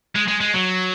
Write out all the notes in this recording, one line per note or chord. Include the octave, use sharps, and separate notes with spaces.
G#3
G#3
G#3
F#3